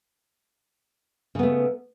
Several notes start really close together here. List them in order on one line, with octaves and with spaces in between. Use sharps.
C#3 B3 A3